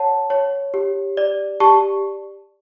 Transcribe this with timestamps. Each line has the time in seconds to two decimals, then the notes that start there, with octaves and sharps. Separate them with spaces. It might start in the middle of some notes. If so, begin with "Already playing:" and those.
Already playing: C#5 F#5 A5
0.30 C#5
0.74 G4
1.17 D5
1.60 G4 A5 C#6